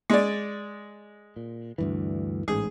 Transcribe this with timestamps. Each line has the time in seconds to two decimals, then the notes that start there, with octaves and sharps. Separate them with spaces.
0.10 G#3 D5
1.36 A#2
1.78 D2 G2 E3
2.48 A1 G#2 G#4